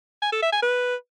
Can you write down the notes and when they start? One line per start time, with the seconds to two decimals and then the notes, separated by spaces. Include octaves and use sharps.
0.22 G#5
0.32 A4
0.42 E5
0.52 G#5
0.62 B4